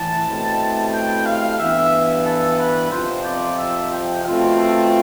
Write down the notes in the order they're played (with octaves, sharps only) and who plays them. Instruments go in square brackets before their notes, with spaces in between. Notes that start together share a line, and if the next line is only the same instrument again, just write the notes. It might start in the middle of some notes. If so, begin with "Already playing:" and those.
Already playing: [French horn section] A2 E3 [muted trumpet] A5
[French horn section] B2 A3 C4 E4 G4
[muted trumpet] G5
F5
[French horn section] G2 E3 B3 [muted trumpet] E5
[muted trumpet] A4
B4
[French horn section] F2 C3 F3 C4 F4 [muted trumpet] C5
[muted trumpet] D5
E5
G5
[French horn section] B2 A3 C4 F4 [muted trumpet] F5
[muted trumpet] A4